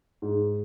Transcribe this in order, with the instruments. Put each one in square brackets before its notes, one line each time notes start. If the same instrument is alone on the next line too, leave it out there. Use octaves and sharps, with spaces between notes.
[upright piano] G#2